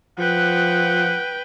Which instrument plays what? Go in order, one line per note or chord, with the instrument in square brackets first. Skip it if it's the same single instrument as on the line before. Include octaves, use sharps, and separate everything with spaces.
[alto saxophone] F3 [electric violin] B4 G5 [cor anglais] F#5